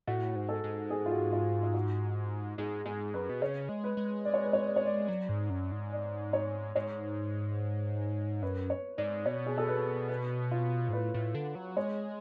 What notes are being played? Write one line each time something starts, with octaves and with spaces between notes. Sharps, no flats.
A2 F#4
G#2
A4
G#2
G#4
F4
F#4
F4
F4
F#4
G#2 G#4
G#2 G#4
F#2 B4
B2
C#3 C#5
G#3
B4
G#3
D5
C#5
B4
C#5
D5
C#5
D5
F#3
G#2
F#2
G#2
D5
C#5
G#2 C#5
F#2 B4
C#5
G#2 D5
B2 C#5
G#4
A4
B4
B4
F4
G#2
A2 B4
A2
D3
F#3
G#3 C#5